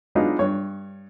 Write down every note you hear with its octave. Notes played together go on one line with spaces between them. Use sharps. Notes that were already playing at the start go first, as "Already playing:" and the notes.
F#3 G#3 B3 D4 D#4 F4
G2 C#5